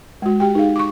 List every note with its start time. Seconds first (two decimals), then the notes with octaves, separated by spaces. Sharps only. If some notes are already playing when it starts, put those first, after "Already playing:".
0.22 G#3 F#4
0.40 G4 G5
0.55 D#4 G#4 F5
0.76 C#6 D6